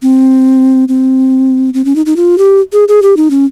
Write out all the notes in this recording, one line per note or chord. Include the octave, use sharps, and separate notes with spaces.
C4
C4
C4
C#4
D#4
D#4
F4
G4
G#4
G#4
G4
D#4
C#4